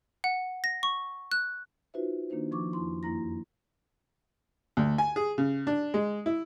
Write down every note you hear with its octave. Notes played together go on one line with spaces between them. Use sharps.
F#5
A#6
C#6
F#6
D#4 F4 F#4 B4 C5 E5
D#3 A#3 D4 D#4 C5
F3 C#6 D6
F2 F3 E4 C6
F#2 A#3 E4 A#5 A#6
D2
G#5
G#4
C#3
D4
G#3
E4